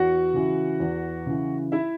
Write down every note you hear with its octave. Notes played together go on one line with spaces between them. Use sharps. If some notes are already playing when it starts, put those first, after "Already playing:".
Already playing: E2 F#4 F#5
C#3 E3
E2
C#3 E3
E4 E5